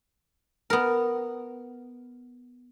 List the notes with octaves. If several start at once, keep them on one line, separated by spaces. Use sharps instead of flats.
B3 A#4